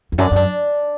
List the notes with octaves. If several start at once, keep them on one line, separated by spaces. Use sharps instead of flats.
E2
F#2 D4
F#2 D4